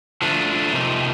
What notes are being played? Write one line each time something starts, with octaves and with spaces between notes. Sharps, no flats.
D3 F3 A3 D4
C3 F3 A#3 D#4